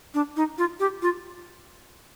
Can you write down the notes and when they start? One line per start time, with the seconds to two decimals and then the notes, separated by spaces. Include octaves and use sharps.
0.14 D4
0.36 D#4
0.58 F4
0.80 G4
1.02 F4